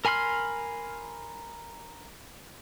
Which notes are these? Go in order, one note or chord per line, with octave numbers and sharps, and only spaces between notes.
A#4 G#5 B5 C6 F6